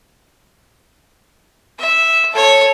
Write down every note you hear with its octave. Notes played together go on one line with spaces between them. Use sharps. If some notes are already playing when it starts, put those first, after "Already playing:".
E5
A4 C#5